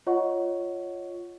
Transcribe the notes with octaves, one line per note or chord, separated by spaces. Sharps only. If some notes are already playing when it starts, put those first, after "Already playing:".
F4 C#5 D#5 F#5 C#6